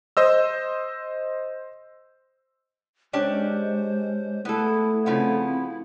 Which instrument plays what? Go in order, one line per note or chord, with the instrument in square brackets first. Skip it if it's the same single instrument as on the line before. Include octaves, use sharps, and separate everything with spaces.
[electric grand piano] C5 D#5 E6
[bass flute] G#3 [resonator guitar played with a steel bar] C#4 D4 G4 [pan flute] C5
[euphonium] A3 [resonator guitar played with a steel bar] B3 A4 [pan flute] E4
[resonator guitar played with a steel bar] C#3 F3 B3 [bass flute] C4 [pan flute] E4